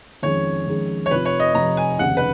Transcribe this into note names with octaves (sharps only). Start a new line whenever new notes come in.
F2 D#3 G#3 C#4 G#4 C#5
F2 D#3 G#3 C#4 G#4
C#5
F1 F2 F3 B4
C#5
D#5
F1 F2 F3 A#5
G#5
F1 D#2 C#3 F#5
B4